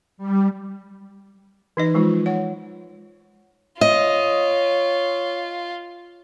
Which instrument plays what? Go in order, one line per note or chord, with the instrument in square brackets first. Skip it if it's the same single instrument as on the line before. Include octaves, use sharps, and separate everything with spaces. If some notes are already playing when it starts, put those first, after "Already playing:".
[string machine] G3
[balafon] E3 D#4 D#5
F3 G#3 D#4 F4
C#5 F#5
[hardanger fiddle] F4 [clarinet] C#5 [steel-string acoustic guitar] D#5